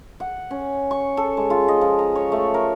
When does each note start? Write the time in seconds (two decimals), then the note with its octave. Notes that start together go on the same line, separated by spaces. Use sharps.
0.20 F#5
0.51 C#4
0.91 C#6
1.17 A4
1.37 G#3
1.50 F4
1.68 D#5
1.81 F3
1.99 A#5
2.16 C#5
2.32 A3
2.54 A#4